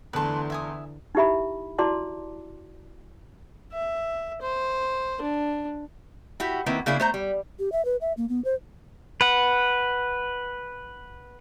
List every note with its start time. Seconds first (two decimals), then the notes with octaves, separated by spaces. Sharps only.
0.13 E2 D3 E3 A3 B4 A5 C6
0.50 E5 G#5 D#6
1.15 D#4 E4 G4 E5 B5
1.78 E4 F#4 D5 A5 C6 D6
3.73 E5
4.42 C5
5.22 D4
6.40 E4 F#4 G4
6.66 D#3 A#3 C4 E4 B4
6.86 C#3 A#3 D4 E4 G#4
7.00 A3 C5 A#5
7.14 G3
7.59 G4
7.72 E5
7.85 B4
8.01 E5
8.17 A#3
8.29 B3
8.45 C5
9.21 B4 F#5